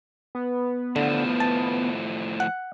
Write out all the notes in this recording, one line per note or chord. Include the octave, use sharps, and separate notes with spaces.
B3
A2 D3 F3
A5
F#5